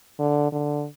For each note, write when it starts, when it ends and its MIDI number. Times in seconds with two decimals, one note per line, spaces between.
0.19 0.52 50
0.52 0.86 50